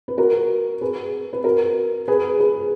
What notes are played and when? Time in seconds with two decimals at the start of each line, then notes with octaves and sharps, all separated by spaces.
0.08 B4
0.17 F#4 A#4
0.81 G#4 B4
1.33 B4
1.44 F#4 A#4
2.08 G#4 B4
2.40 G#4 B4